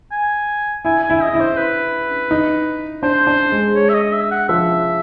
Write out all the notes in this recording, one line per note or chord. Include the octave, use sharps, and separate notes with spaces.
G#5
E4 G#5
G#5
E4
D#5
E4
C5
B4
D#4
D4 C5
D4
G#3
C#5
E5
D#5
E5
F#5
F3 E5